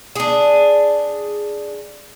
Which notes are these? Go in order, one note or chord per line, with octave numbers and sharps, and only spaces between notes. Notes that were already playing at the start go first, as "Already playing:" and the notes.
D4 G#4